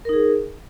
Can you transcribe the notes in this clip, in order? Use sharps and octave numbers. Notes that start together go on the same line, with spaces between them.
D#4 G#4 A#4